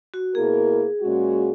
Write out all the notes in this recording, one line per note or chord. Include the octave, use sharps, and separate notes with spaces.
F#4
B2 A#3 E4 G#4 A#4
A#2 G#3 C#4 F#4